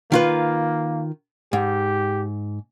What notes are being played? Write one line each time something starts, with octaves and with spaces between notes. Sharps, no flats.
D#3 A#3 F4 B4
G#2 G4